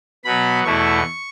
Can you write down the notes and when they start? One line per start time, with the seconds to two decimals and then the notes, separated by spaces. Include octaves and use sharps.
0.25 B2 F#3 B3 B5
0.64 E2 B2 A3 E4 C#6